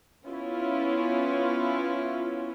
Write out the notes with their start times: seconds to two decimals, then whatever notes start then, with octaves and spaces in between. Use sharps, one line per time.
0.25 B3 C#4 E4 F4